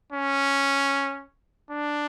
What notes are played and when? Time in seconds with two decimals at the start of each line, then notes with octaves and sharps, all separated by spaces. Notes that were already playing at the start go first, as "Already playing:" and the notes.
0.12 C#4
1.71 D4